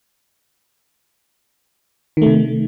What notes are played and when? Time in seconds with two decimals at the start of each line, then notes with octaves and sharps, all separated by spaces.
2.17 D#3
2.22 A3
2.26 C3